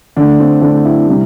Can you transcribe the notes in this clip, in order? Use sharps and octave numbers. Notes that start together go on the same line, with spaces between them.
D3 A3 D4
C4
D3 A3 D4
E4
C3 G3